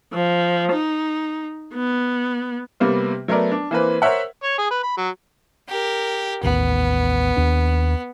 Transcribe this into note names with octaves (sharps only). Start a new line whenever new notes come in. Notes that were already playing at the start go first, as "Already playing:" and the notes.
F3
D#4
B3
C3 G3 A#3 B3
F#3 A3 B3 A#4 D5
D4
E3 A#3 C4 B4
A#4 C5 C#5 E5 F#5
C#5
G#4
B4
B5
F#3
G4 A#4
A1 D#2 B3
D#2 D4